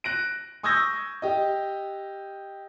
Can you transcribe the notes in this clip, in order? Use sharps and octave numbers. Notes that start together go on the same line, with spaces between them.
F#6 A#6 D7
C#6 D#6 E6 G6 G#6 A#6
G4 D#5